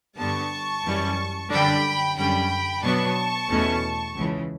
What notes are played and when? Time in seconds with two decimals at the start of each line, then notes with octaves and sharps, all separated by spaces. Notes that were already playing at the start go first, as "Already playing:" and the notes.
0.18 G2 D3 G3 B3 A5 C#6
0.84 F#2 E3 G3 C#4
1.50 F#2 D3 G3 D4 G5 B5
2.16 F#2 D3 G3 C#4 G5 B5
2.82 B2 F#3 B3 D4 A5 C#6
3.49 E2 B2 A3 C#4
4.15 C#2 C#3 E3